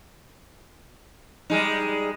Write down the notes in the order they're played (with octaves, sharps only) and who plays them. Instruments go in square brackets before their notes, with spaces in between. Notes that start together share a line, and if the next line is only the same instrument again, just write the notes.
[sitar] G3 G#3 D#4